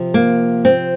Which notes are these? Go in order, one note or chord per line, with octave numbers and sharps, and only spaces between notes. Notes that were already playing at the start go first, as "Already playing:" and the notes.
Already playing: C3 F3
A#3
C4